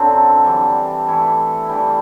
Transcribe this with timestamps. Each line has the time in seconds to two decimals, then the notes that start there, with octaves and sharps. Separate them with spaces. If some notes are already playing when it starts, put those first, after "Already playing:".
Already playing: F#2 D3 F#3 C4 D4 A4
0.45 E3 G3 D4
1.06 E3 A3 E4 A4
1.68 E3 G3 D4